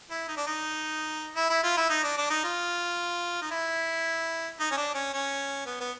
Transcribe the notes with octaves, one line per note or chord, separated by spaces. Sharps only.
E4
D#4
D4
D#4
E4
E4
F4
E4
D#4
D4
D4
D#4
F4
D#4
E4
D#4
C#4
D4
C#4
C#4
B3
B3